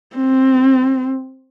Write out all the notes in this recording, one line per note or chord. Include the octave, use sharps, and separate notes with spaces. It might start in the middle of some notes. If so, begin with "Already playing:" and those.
C4